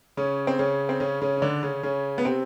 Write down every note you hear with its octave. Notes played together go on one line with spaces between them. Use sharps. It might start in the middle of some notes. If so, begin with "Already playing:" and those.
C#3 C#4
C4
C#3 C#4
C4
C#3 C#4
C#3 C#4
C#4
D3 D4
C#3 C#4
C#3 C#4
B3
C3 C4